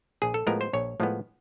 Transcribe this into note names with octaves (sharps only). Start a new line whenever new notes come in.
A#1 G#4
A4
A2 F3 G#3 B3 A#4
C5
A#1 C#5
A2 F3 G#3 B3